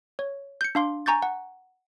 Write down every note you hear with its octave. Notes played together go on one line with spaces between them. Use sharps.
C#5
G6 C#7
D4 F5 C6 D6
G#5 A#5 C#6 G6 A6
F#5